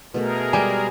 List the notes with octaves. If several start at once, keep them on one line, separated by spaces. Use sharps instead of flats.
B2 A3 G#4 A#4
G3 G#3 G#5